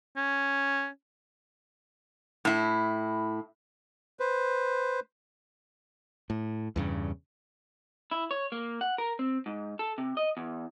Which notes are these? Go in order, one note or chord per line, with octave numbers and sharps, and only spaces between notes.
C#4
A2 E4
B4 C5
A2
E2 G2 C#3
E4
C#5
A#3
F#5
A#4
C4
G#2
A4
C3
D#5
E2